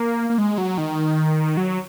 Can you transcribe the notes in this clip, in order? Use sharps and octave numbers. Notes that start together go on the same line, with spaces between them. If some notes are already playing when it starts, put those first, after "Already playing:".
Already playing: A#3
A#3
G#3
F#3
D#3
F#3